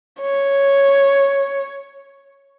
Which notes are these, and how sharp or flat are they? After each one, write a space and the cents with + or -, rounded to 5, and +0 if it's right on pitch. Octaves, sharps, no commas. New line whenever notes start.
C#5 +0